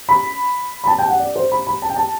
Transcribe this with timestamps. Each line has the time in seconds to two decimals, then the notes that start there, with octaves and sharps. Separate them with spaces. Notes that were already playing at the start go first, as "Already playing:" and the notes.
0.09 B5
0.84 B5
0.87 A5
0.98 G5
1.08 F#5
1.20 D5
1.36 C5
1.52 B5
1.67 B5
1.82 A5
1.90 G5
1.96 A5